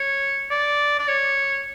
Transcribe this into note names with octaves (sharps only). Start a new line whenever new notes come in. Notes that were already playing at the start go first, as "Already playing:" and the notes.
Already playing: C#5
D5
D5
C#5